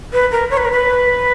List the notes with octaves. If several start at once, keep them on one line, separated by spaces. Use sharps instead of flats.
B4
A#4
C#5
B4
A#4
B4